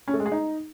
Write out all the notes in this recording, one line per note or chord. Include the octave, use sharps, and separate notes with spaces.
C#4
A3
G#3
G#4
D#4